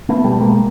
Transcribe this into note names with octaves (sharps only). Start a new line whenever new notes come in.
A3 B3
B2 G3 A3
G#3 A#3